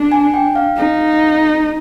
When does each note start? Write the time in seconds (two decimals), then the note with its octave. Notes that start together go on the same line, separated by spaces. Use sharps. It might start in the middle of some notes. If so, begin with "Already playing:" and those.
Already playing: D4
0.12 G#5
0.34 G5
0.56 F5
0.77 D#4